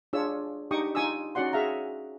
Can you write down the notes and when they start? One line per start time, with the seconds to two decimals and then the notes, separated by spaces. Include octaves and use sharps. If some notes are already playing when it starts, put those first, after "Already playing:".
0.13 D4 F4 G#4 C#5 E6
0.71 D4 D#4 G4 G5 C#6 D#6
0.95 D#4 F4 G#5 C#6 D#6 E6
1.35 C#4 D#4 F#4 D5 F#5 C6
1.52 F#4 G#4 E5 F5 A#5 C#6